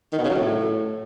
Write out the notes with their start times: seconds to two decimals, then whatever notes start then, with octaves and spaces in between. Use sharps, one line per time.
0.13 D#3
0.18 B2
0.24 C#3
0.30 F#3
0.35 A2